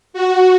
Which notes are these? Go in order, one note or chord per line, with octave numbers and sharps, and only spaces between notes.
F#4